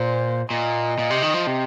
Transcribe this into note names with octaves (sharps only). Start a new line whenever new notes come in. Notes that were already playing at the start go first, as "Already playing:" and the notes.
Already playing: A#2 C5
A#2 D#5
A#2
C3
D#3
F3
C3